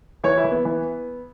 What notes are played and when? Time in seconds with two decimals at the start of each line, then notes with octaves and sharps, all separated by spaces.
0.24 E3 C#5
0.37 E4
0.44 E3
0.51 B3
0.65 E3